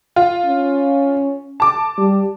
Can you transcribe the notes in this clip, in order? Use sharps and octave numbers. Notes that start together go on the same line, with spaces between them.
F4
C#4
A5 D6
G3